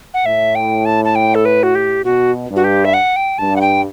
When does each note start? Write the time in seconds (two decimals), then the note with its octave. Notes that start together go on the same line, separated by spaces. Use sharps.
0.14 F#5
0.26 A2 E5
0.55 G5
0.85 A5
1.05 A5
1.15 G5
1.35 A4
1.45 B4
1.63 F#4
1.75 G4
2.04 B2 F#4
2.49 G2
2.56 F#4
2.64 G4
2.85 E5
2.94 F#5
3.16 G5
3.38 G2 A5
3.56 F#5
3.61 G5